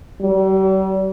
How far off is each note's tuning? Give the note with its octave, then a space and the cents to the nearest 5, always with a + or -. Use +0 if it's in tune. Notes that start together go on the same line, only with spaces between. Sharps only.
G3 -40